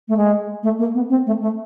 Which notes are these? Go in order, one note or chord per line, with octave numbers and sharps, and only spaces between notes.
A3
G#3
A3
A#3
B3
C4
A3
A3